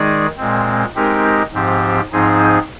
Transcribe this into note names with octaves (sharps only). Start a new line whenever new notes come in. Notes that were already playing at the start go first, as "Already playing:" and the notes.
Already playing: D#3 G#3 D#4 G#4 D5
A#2 G#3 C4
G#3 C4 D#4 G4 A#4
G#2 F3 C4 G4
G#2 F3 C4 D#4 G#4